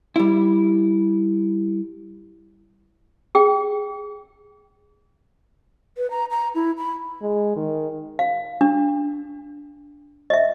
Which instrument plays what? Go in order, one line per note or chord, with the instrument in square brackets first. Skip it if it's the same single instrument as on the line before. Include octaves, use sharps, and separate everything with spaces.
[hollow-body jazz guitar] G3 E4
[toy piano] G#4 G5
[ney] B4
A#5
A#5
E4
B5
[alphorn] G#3
D#3
[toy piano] F5
D4
D#5 E5